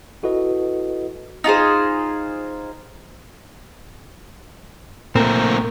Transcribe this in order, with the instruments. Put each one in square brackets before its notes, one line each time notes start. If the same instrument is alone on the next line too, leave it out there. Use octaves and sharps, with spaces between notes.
[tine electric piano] E4 F#4 A4 B4 D#5
[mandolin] D#4 F4 G#4 C5
[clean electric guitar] A#2 A#4 [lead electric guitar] A3 C4